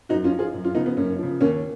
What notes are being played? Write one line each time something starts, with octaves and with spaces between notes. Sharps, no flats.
F#2 D#4 F#4
C#4 F4
F3
F4 G#4
F#2
C#4 F4
C#3 F3 B3 D#4
B3
F#2 A#3 C#4
C#3 F3
D#2 A#3 C#4